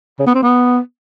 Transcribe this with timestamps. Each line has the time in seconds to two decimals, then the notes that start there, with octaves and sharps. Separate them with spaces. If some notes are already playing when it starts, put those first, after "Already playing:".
0.19 C#3
0.27 B3
0.35 C4
0.42 B3